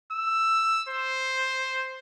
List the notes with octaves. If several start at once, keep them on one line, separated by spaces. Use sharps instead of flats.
E6
C5